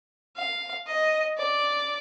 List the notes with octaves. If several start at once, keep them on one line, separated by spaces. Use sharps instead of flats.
F5
D#5
D5